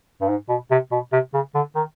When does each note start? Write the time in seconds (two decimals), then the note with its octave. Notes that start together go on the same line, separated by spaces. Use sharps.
0.22 G2
0.29 G#2
0.49 B2
0.71 C3
0.92 B2
1.13 C3
1.34 C#3
1.55 D3
1.76 D#3